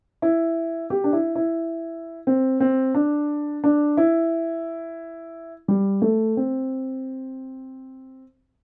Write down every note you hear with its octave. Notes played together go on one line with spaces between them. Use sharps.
E4
G4
D4
E4
E4
C4
C4
D4
D4
E4
G3
A3
C4